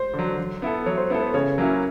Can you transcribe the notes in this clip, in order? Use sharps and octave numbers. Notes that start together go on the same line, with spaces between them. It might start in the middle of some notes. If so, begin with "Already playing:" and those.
Already playing: C5
D3 F#3
F#3
B3 E4 A4
F#3 C#5
C5
B3 E4 A4 B4
B4
C#3 C#5
F#3 A#3 C#4 E4